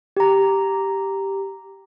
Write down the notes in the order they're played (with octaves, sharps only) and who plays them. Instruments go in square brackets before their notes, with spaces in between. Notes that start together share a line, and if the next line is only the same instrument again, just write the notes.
[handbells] G4 A#5